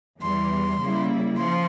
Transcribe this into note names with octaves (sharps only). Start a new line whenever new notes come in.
E2 E3 G3 C6
C#3 G3 A#3 E4
F3 C6